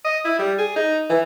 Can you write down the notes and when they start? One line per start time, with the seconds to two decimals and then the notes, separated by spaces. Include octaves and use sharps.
0.05 D#5
0.25 E4
0.39 G3
0.58 G#4
0.76 D#4
1.10 E3